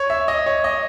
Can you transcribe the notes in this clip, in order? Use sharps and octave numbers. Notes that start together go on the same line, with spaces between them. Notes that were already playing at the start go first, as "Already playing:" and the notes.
Already playing: C#5
E5
D#5
C#5
D#5